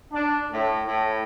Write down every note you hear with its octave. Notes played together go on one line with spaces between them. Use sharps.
D4
A2
A2